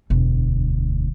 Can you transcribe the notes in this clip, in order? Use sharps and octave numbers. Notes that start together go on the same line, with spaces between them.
E1 D2